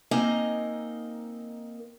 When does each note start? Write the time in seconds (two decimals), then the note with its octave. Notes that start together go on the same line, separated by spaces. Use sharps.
0.11 A#3 C4 D#4 A#4 D#5 G#5